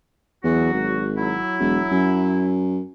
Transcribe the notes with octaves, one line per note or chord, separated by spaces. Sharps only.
E2 F#3 F#4
G#1
F#3 E4
E1
F#2